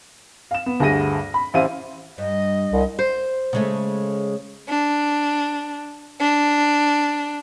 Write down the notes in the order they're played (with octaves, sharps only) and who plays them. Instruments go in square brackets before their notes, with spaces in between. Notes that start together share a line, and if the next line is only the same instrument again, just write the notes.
[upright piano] F5 E7
B3
D2 G2 G#4 E5 A#6 D#7
B5
A1 E4 G4 C5 F5 D#7
[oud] G2 [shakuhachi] D#5
[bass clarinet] C2
[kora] C5
[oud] C#3 G#3 A3
[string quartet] D4
D4